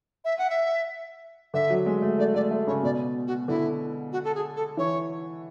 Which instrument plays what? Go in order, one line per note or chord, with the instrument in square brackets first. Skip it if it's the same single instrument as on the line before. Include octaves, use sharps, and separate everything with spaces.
[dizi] E5
F#5
E5
[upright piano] D3 [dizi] E5
[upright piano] F#3
G#3
A3
[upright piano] A3 [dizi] D5
[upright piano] A3 [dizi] D5
[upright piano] A3
[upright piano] C#3 [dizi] C#5
[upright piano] B2 [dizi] D5
[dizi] F#4
[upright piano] D3 [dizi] E4
[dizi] F#4
A4
G#4
A4
[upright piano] E3 [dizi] C#5